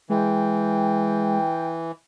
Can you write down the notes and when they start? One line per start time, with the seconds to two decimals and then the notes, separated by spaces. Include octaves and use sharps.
0.10 E3 G#3 G5